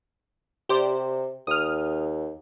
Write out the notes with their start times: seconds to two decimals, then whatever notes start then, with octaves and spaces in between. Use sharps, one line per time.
0.69 C3 G4 C5 D5
1.47 D#2 D#6 F6